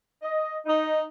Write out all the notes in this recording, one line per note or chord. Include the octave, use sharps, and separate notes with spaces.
D#5
D#4